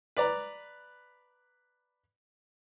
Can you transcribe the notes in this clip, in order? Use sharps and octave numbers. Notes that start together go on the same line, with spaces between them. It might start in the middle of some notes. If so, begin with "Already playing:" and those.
B4 D5 A#5